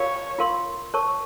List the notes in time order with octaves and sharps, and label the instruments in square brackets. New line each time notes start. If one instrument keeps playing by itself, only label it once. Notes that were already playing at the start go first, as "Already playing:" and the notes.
Already playing: [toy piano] F4 A#4 F5 [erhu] C#5
[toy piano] F4 A#4 F5 C6
A#4 C#5 A5 C#6